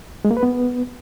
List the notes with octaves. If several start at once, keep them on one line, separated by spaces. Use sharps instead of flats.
G#3
A#3
B4
B3